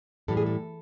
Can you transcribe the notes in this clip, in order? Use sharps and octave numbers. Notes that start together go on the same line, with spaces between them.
A2 E3 G3 A4
G#4
A4